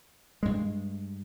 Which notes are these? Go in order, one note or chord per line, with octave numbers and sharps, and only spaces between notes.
G2 G#3